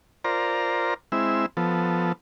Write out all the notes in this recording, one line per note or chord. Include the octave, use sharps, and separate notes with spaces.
F4 A#4 C5 D5 A#5
G#3 C4 E4 E5
F3 B3 A4